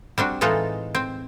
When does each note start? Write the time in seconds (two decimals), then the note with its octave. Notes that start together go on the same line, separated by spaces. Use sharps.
0.18 G3 C4 D4 F#4
0.41 A2 E3 G#3 D#4 F4 A4
0.95 C4